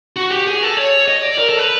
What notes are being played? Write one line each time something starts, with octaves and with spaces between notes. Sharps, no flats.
F#4
G4
G#4
A4
C#5
D#5
D5
A#4
A4
B4